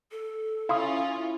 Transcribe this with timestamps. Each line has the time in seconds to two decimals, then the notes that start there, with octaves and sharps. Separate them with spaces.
0.11 A4
0.69 C#4 E4 F4 F5 C6 D#6